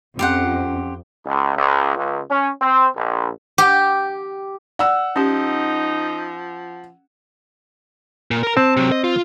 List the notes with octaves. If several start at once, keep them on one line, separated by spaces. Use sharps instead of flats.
F2 C#4 G4 C5 F#5
C#2
C#2
C#2
C#4
C4
A#1
G4
D5 F#5 E6
F3 C#4 D#4 G4
A#2
A#4 A#5
C4 A5
C3 F#3
D#5
F4